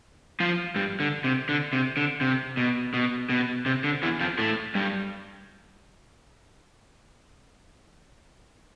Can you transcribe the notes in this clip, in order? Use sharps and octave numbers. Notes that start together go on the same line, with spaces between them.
F3 F4
G2 G3
D3
C3
D3
C3
D3
C3
B2
B2
B2
C3
D3
E2 E3
F2 F3
A2 A3
G2 G3